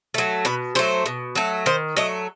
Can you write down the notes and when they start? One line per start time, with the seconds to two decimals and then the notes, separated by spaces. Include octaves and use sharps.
0.14 F#3 A3
0.45 B2 B4
0.75 F#3 A3 C5
1.06 B2
1.35 F#3 A3
1.66 D#3 C5
1.96 F#3 A3 D#5